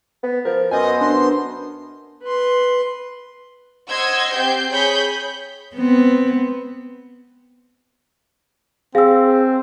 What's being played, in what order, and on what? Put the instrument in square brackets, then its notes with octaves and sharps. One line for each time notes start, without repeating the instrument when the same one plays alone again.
[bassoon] B3
[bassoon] F3 [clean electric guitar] A#4
[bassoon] F#2 [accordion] B3 C5 [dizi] D#5 [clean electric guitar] G#5
[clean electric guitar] D4 [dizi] C6
[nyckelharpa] B4 C6
[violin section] C5 D#5 F#5 C6 E6 G#6
C4 G4 G6 C7
G#4 C#5 B5 G6
[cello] B3 C4
[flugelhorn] C4 [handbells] G#4 [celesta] F5 E6